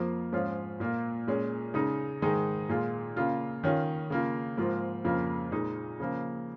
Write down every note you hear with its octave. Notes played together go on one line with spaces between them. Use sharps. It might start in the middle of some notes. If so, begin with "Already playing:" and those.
Already playing: F2 F3 A#3 F4
G#2 F3 C#4 F4
A#2 A#3 F4
A#2 G#3 C#4
C#3 G#3 D#4
G#2 D#3 G#3 D#4
A#2 G#3 F4
C#3 A#3 F4
D#3 C#4 F4
C#3 A#3 F4
G#2 F3 A#3 F4
F2 C#3 A#3 F4
A#2 G#3 D#4
C#3 F3 A#3